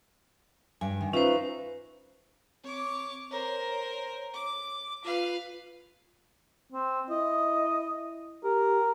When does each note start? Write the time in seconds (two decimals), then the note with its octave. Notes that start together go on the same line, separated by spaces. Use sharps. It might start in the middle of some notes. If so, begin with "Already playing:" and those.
0.81 G2 G#5
1.01 D#3
1.13 C#4 D#4 F4 B4 C5 E5
2.64 C4 C#5 D6
3.31 A#4 C5 C#5 A#5
4.34 D6
5.04 F4 B4 F5
6.72 C4
7.11 E4 D#5
8.44 G4 A#4